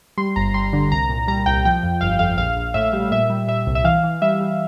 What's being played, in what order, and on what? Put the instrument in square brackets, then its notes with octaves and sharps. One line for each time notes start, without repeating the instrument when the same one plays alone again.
[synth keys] G3 C6
G1 A#5
G3 C6
D3
C2 A#5
A#2
G3 A#5
C2 G5
F3 G5
F2
G1 F5
F2 F5
A#1 F5
A#1
A2 E5
G3
A#2 E5
G3
A#2 E5
C2
E5
E3 F5
E3
G3 E5
G3